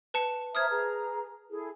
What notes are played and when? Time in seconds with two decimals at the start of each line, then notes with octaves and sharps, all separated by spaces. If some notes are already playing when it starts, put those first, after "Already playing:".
0.14 B4 A5 C#7
0.55 C5 E5 A#5 D#6 F6 G#6
0.69 G#4 B4 A#5
1.50 E4 G#4 A4